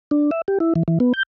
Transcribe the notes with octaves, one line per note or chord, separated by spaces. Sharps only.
D4
E5
G4
E4
E3
E3
B3
G6